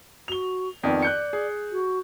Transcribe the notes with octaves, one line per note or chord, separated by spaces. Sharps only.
F#4 F7 G7
F2 D#3 B3 D5
F#6 G6 C#7
G#4
F#4